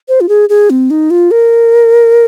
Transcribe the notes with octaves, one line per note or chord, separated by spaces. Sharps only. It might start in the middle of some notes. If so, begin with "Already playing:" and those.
C5
F4
G#4
G#4
C4
D#4
F4
A#4